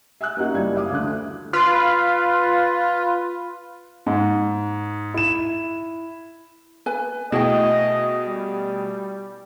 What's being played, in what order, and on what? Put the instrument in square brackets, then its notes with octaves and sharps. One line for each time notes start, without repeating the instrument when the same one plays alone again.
[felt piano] E5 G#5 E6 F#6
A#3 C#4 D#4 F#4
F#1 G3 E4 G#6
E5 F5 D6 D#6
D2 D3 F#6
[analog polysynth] F4 B4
[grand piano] G#2
E4 E7
[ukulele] B4 G#5
[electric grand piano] B2 A3 G#4 [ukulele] E4 G5 [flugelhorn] D#5
[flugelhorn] G3